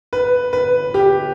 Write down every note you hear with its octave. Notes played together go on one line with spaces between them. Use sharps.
B4
B4
G4